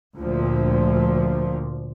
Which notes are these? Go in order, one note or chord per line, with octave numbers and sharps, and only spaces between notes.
D2 A#2 F3